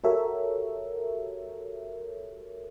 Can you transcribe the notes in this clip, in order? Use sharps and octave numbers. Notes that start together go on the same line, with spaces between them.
F#4 G4 A4 A#4 C#5 E5